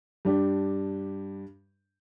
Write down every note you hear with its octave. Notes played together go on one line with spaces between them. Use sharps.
G2 D4 G4